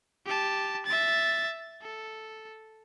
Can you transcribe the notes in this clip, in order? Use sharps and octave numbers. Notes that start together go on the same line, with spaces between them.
G4 A5
E5 A6
A4